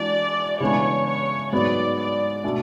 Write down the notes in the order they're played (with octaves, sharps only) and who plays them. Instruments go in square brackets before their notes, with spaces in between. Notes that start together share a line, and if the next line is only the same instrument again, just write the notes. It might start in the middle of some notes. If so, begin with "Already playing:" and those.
Already playing: [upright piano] E3 G#3 D4 F#4 [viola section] D5
[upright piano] C#3 E3 G#3 B3 D4 [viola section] C#5
[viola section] C#5
[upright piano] G#2 F#3 B3 [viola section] D5
[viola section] D5
[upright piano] B2 A3 D4